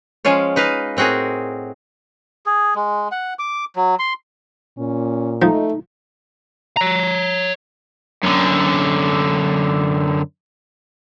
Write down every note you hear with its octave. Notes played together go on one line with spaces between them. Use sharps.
F3 G#3 C#4 F4 C#5
D#4 B4 D#5 F5
A2 C4 F#4 G#4 A#4
G#4
G#3
F#5
D6
F#3
C6
A#2 C#4
F3 A3 D#4
C#5 A#5
F#2 D3